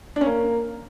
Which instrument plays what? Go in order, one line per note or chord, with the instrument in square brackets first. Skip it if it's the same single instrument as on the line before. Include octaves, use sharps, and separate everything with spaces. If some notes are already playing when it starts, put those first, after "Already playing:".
[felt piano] D4
C#4
A#3